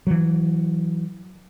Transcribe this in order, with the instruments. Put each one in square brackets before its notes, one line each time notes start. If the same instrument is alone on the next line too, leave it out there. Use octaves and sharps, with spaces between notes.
[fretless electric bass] E3 F#3